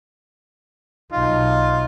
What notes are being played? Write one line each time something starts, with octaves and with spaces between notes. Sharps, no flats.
B1 D#4 F4